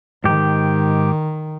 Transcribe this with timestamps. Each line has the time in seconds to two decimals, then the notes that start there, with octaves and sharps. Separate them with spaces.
0.24 G#2 D#3 G4